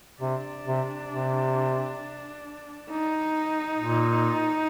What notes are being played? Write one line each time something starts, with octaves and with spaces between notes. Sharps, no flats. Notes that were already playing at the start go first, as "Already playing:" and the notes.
C3 D4
C3
C3
D#4
A#2